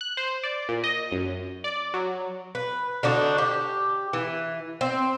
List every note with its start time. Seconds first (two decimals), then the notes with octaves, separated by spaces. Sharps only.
0.01 F#6
0.17 C5
0.43 D5
0.69 A#2
0.84 D#5
1.12 F#2
1.64 D5
1.94 F#3
2.55 B4
3.03 D3 D4 D#4 F#4
3.38 G4
4.13 E3
4.81 C4